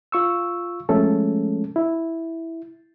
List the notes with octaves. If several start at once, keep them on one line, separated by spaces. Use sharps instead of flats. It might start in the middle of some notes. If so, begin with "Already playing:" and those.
F4 C#6 E6
F3 G#3 A3 C#4 A4
E4